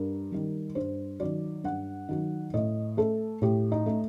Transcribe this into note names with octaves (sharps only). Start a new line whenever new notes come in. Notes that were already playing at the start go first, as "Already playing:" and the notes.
Already playing: G2 A#4
D#3 G3
G2 C5
D#3 F#3 D5
G2 F#5
D#3 F#3
A2 D#5
A3 A4
A2 G4
D#4
A3